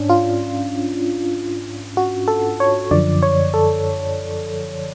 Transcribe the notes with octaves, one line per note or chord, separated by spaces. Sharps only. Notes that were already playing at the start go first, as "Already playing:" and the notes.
Already playing: G#2 C#4 D4
F4
F#4
A4
C#5
F#2 D3 F3 D5
C#5
A4